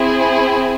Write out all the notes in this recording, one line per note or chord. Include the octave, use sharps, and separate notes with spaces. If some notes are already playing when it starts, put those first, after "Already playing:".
Already playing: C4 E4 G#4